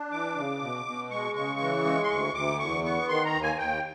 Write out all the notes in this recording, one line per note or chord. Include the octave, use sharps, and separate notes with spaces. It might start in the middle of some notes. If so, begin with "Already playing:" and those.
Already playing: D4
E3 D6
C#3
B2
B2
G#3 C#6
C#3 C#6
E3
G#3
C6
D2 C#6
D2 D6
E2 C#6
B3 C#6
D#3 C6
A#5
D#2
G#5
D#2 G5